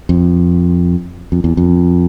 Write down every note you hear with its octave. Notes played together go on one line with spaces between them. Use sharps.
F2
F2
E2
F2